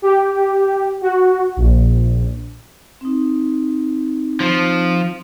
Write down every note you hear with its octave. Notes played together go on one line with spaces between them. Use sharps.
G4
F#4
A#1
C4 D#4
F3